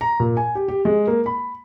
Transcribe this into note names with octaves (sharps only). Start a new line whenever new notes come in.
A#5
A#2
G#5
G4
G4
G#3
A#3
B5